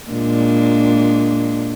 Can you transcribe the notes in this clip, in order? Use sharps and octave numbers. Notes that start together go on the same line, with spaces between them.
A#2 G#3 D4